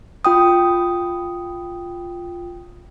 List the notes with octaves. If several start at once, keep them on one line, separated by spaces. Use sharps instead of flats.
F4 G5 D#6